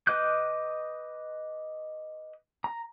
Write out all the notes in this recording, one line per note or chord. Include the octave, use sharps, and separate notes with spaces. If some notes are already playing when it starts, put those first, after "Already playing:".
B4 D#5 D6 F#6 G6
A#5